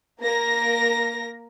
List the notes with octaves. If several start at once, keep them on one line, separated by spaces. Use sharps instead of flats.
A#3 A#4 A#6